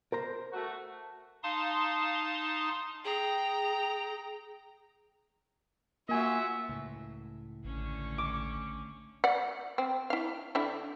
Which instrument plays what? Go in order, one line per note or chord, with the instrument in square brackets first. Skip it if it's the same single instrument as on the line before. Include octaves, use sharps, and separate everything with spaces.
[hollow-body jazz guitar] A#4 C5 A#5
[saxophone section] A3 F#4
[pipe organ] D#4 F5 A5 C6 D#6
[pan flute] G#4 [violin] G5 A#5
[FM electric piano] A#3 G#5 [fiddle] F4 F#4 [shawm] E5
[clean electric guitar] C#2 A2
[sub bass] A1 [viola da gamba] D3 A3 C#4
[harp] D6
[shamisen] D5 F#5
C4
E4 F5
D3 D4 E4